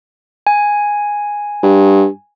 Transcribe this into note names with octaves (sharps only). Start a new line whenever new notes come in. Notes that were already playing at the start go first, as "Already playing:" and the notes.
G#5
G2